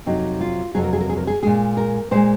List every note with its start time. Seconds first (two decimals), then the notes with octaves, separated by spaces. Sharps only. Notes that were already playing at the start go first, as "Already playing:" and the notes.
0.06 F2 C3 F#3 D#4
0.41 F4
0.74 F2 C3 F#3 G#4
0.84 A#4
0.93 G#4
1.01 A#4
1.10 G#4
1.18 A#4
1.27 G#4
1.43 A#2 G#3 G#4
1.77 A#4
2.11 A#2 G#3 C5